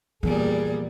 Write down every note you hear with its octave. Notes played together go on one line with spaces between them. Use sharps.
E2 A#2 E3 G3 G#4